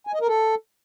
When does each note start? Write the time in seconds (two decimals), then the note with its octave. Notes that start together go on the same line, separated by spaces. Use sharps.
0.07 G#5
0.14 D#5
0.21 A#4
0.28 A4